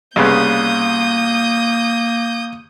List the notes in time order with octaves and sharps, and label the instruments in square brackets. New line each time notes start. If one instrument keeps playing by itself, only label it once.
[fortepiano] C2 C#3 B3 [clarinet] A#3 [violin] D#6 G6